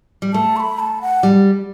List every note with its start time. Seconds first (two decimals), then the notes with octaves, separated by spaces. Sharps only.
0.22 G3
0.33 A3 A5
0.56 C#6
0.60 B5
0.79 A5
1.02 F#5
1.23 G3